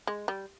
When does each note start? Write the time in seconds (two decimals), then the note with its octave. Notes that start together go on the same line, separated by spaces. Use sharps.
0.07 G#3
0.28 G3